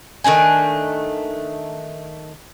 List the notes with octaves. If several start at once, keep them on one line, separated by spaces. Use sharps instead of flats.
D#3 A3 D4 G#5